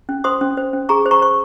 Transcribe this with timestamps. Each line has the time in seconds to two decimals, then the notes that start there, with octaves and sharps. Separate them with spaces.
0.09 C#4
0.24 C5 C6 D#6
0.41 C#4
0.57 C5
0.73 C#4
0.89 G#4 A#5 C#6
1.06 C5
1.11 A#5 C#6
1.22 C5 C#6